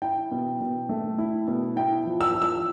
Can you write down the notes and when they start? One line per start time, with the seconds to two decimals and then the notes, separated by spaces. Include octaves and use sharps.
0.02 E4 G5
0.31 B2
0.61 B2
0.89 A3
1.18 E4
1.48 B2
1.76 E4 G5
2.05 F3
2.21 E6
2.34 F3
2.42 E6